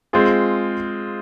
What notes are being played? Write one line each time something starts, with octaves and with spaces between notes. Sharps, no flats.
G#3 C4 F4 G#4